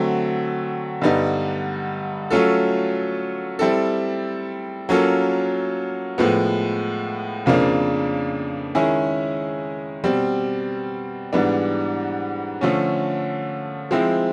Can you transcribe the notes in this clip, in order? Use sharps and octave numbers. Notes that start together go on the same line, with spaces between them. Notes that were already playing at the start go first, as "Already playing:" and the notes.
Already playing: D3 F#3 A3 C4
G2 D3 G3 B3 D#4
F#3 A3 C#4 F4 A4
G3 C4 E4 A4
F#3 A#3 C#4 F4 A4
A2 F3 G#3 B3
F2 C#3 F3 A#3 D4
D#3 G#3 C#4 E4 G#4
B2 G3 C4
G#2 E3 G3 B3 D4
D3 F3 A3 C#4
F3 G#3 C4 E4